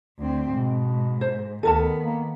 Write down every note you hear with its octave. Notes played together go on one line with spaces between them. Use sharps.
D2 C4
G#2 B2
C5
D2 D#3 B3 A4 A#4 A5
A#3